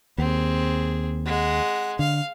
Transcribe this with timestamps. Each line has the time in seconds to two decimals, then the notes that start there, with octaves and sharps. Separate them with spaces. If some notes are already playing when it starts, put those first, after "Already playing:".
0.18 D#2 C4 G#4
1.26 G#3 F#5
1.99 D3 F5